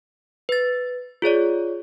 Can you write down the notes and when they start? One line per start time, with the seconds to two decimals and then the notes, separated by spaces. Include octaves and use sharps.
0.49 B4 A6
1.22 F4 G#4 C#5 D5